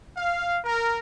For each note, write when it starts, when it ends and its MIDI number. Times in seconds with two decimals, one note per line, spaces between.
0.17 0.58 77
0.64 0.99 70